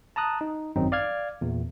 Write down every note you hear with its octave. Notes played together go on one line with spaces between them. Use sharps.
A5 A#5 D#6 F#6
D#4
G#1 F#2 F#3 C4 D#4
D5 F5 F6 G#6
E2 A#2